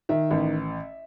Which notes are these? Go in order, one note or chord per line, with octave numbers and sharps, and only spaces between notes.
D#3 E5
A1